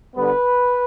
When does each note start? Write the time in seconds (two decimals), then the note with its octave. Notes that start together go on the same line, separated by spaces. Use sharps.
0.15 D3 G3 B3 B4